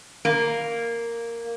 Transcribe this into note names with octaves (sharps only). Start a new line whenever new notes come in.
A#3